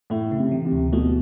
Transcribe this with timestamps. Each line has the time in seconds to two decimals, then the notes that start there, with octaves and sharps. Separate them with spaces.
0.10 A2 A3
0.31 C#3
0.38 C3
0.52 E3
0.65 C3
0.73 D2
0.92 B2 A3